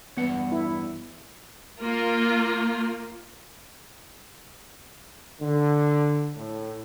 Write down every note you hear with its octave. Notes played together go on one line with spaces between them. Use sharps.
E2 G2 B3 F#5
E4
A#3 F4
D3
A2